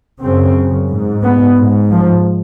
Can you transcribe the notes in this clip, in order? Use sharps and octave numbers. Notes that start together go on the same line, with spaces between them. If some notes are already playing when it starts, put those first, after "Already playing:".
F#2 C#3 C4
G#2
B3
G#2
F3